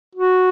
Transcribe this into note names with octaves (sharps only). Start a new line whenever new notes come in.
F#4